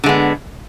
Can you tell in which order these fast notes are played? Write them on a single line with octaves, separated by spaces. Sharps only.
D3 G#3 B3